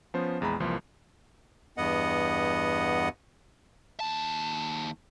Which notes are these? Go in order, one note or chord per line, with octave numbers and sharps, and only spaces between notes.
F3 B3 C#4 C5
A#1 E2 G#3 A#5 B5
C2 E3 F3 A#3 C6
E2 G2 B3 D#5 F#5
D#2 A5